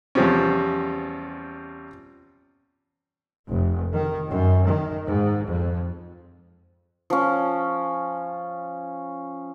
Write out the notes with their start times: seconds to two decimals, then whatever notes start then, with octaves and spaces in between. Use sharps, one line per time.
0.15 E2 C3 F3 G3 C4 C#4
3.50 F1
3.92 D#3
4.30 F#2
4.67 D#3
5.07 G#2
5.47 F2
7.10 F3 C#4